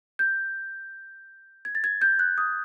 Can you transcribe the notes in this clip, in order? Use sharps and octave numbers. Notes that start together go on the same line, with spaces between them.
G6
G#6
A6
G#6
G6
F#6
D#6